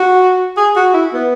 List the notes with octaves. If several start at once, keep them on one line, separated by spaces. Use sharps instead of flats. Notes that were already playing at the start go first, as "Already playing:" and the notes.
Already playing: F#4
G#4
F#4
E4
B3